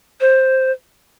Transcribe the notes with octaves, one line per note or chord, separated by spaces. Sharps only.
C5